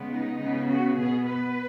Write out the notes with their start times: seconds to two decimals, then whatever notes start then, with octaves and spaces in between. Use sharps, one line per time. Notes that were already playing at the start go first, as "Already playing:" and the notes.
Already playing: C#3 G#3 B3
0.11 D#4
0.40 C#3 B3
0.68 F#4
0.97 B2 B3 G#4
1.26 B4